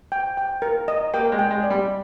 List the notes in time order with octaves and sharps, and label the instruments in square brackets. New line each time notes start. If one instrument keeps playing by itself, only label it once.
[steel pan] G5
G5
A#4
D#5
[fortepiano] A#3 [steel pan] G5
[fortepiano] G#3
[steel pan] G5
[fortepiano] G#3
[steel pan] D5
[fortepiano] G3